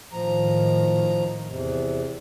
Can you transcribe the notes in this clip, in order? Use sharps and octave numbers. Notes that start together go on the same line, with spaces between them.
A2 D#3 F3 A#5
E2 C3